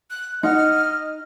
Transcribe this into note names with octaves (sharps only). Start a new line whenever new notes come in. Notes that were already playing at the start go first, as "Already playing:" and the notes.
F#6
D#4 D#5 F#5 F6